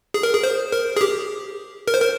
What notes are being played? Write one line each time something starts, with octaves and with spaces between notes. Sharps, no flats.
G#4
A#4
G#4
C5
A#4
G#4
G4
A#4
C5
A#4